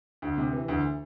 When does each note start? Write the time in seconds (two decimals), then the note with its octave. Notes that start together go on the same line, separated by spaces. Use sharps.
0.22 D2
0.38 C3
0.53 E3
0.68 D2